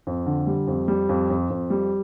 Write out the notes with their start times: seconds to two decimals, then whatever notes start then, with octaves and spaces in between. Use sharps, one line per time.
0.07 F2
0.26 D3
0.47 G3
0.67 F2
0.88 G3
1.09 F2
1.30 F2
1.50 F2
1.70 G3